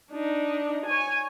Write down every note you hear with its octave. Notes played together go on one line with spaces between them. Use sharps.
D4 D#4
C#5 G#5